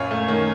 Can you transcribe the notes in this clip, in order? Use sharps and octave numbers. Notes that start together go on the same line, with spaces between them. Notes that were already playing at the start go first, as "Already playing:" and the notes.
Already playing: F#2 A#2 C#5 F5
A3
D#3